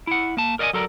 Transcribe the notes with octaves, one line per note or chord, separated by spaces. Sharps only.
E4 F#5
A#3 A5
A#4 D5 D#5 F#5 G#5
F#3 A4 A#4 D5